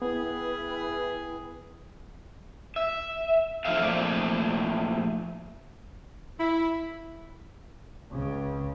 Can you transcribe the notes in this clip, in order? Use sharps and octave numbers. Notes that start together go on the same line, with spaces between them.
B3 E4 G#4 B4 G5
E5
F3 A4 E5 F5
A#2 F3 A3 D5
E4
C#2 C#3